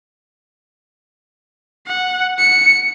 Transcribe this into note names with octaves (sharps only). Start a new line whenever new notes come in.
F#5
C#7